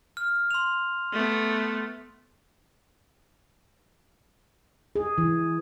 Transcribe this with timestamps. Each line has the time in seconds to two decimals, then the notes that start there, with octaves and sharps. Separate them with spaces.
0.17 F6
0.51 C6 F7
1.13 A3 B3
4.95 G#4
5.18 E3